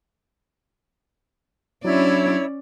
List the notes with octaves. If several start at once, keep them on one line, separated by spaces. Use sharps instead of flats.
F#3 C#4 D4 E4 C#5 D5